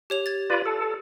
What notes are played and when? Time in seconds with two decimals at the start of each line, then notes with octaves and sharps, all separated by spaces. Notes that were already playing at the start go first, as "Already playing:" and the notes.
0.10 G4 C#5 F7
0.26 G#6 A6
0.50 F4 B4 D5
0.66 A4